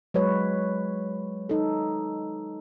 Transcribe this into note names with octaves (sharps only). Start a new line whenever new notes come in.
F#3 G#3 B4 C#5
D#4 A4